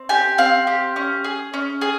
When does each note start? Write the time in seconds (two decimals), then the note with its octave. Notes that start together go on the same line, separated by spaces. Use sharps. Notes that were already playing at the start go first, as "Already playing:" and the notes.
Already playing: C4
0.09 G4 G#5
0.38 C4 F5
0.67 G4
0.96 C#4
1.24 G#4
1.54 C#4
1.81 G#4